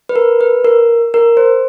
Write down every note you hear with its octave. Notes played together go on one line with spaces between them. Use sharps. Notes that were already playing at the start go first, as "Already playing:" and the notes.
B4
A#4
B4
A#4
A#4
C5